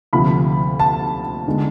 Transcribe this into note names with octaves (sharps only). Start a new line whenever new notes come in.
D2 C3 F3 B5
A5
D3 G#3 B3